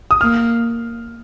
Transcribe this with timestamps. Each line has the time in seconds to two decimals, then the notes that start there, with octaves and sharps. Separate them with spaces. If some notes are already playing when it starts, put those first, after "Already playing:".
0.11 D#6
0.21 A#3 F6